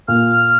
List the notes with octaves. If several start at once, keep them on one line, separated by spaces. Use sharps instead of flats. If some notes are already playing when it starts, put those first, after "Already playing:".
A#2 F6